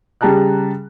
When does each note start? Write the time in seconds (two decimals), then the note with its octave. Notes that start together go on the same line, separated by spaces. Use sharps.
0.21 C#3 G3 G#4 A5 A#5 F#6